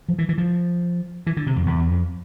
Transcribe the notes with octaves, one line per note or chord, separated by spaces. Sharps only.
F3
E3
E3
F3
E3
D3
C3
F2
E2
E2
F2